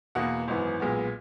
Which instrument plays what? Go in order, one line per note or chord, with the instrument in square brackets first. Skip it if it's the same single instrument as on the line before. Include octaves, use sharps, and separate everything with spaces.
[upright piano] E2 B2 A#3 F#5
G#1 F#2 E3 B3
B1 A#2 G#3 B3